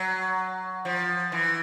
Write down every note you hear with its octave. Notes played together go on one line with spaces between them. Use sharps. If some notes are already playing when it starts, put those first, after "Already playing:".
Already playing: F#3
F3
E3